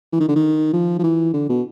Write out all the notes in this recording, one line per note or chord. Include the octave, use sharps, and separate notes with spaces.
E3
D#3
D3
D#3
F3
F3
E3
D3
B2